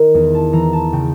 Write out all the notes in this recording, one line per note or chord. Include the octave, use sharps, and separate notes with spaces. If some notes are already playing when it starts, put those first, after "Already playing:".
Already playing: D#3
E2
A5
E3 A#5
A5
C#3 G5